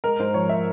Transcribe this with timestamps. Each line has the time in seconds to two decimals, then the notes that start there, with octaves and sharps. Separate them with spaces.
0.04 G#3 A#4
0.19 G#2 C5
0.34 F3 C#5
0.49 E5